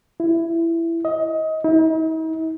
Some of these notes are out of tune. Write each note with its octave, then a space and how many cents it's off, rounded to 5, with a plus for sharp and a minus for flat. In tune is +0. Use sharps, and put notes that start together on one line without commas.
E4 +15
D#5 +25
D#4 +45